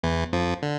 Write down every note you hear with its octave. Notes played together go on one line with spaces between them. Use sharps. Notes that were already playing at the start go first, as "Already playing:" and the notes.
E2 E3
F2 F3
D3